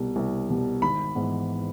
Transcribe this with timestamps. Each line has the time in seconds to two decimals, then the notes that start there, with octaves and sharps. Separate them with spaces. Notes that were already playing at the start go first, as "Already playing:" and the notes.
Already playing: C2 B2 G3
0.16 C2
0.49 B2 G3
0.82 G#1 B5
1.15 G#2 E3 G#3 B3